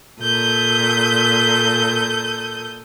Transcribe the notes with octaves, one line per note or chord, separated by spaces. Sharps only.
A#2 A4 D#6 G6